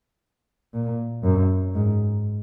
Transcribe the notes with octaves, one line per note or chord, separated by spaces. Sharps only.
A#2
F#2
G#2